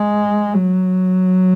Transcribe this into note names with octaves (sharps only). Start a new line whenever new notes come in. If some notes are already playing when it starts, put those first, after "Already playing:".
Already playing: G#3
F#3